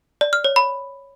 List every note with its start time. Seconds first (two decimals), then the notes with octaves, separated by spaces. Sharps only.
0.21 D5
0.33 F6
0.44 C#5
0.56 B5